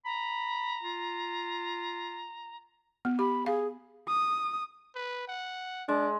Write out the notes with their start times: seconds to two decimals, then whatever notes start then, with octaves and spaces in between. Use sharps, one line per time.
0.05 A#5 B5
0.83 F4
3.05 B3
3.19 G4 B5
3.46 G#4 F5
4.07 D#6
4.95 B4
5.28 F#5
5.89 G#3 D4